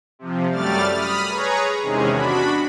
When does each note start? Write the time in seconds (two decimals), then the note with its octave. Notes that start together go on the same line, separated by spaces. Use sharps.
0.19 C3 F3
0.50 F#2 G3 A3 D5 F6 A6
0.92 B5 D#6 F6
1.28 G#4 B4 C#5 A#5
1.81 E2 C3 D#3 G#3 C#4 G#4
2.11 D4 F#4 B5